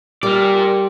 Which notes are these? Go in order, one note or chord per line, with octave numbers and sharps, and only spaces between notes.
G3 A#4 D5